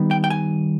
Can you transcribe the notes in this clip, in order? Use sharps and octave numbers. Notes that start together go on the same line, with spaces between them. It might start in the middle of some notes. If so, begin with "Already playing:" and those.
Already playing: D#3 G3 B3 D#4
G5
G5
G#5